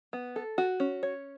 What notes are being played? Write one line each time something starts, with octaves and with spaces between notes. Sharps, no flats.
B3
A4
F#4
C#4
C#5